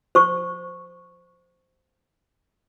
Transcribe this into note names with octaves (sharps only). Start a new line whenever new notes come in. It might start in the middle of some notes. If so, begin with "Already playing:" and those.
C5 C#6